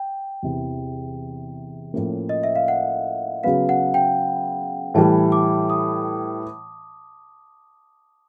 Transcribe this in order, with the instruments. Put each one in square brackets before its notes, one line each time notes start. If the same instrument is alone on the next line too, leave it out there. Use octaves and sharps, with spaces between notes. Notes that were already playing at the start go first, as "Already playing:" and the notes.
Already playing: [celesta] G5
[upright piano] E2 C3 E3
A2 F3 A#3 C#4
[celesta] D#5
E5
F5
F#5
[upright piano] C#3 F#3 B3 [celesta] F5
[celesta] F#5
G5
[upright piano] A2 E3 G3 [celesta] A5
[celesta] D6
D#6